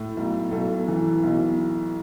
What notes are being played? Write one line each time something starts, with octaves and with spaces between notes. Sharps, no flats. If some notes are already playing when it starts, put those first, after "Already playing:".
Already playing: A2
B1
B1 A4
E3
B1